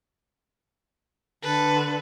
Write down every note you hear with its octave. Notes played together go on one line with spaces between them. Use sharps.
D3 A4 B4